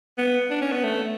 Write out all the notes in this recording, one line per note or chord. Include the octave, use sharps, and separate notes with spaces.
B3
D4
C#4
B3
A3